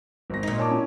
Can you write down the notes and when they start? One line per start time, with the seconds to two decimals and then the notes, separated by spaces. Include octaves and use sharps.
0.30 G#1 A#6
0.43 A#2 D#4
0.57 C#5 A5 D6
0.70 C#4 E4